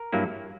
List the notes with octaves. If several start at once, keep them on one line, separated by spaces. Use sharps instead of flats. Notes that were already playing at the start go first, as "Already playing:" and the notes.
Already playing: A#4
G2 F#3 A#3 E4